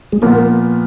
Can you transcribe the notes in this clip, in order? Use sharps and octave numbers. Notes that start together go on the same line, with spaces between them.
G#3 G#4
A#2 F3 A#3 B3 F4 A#4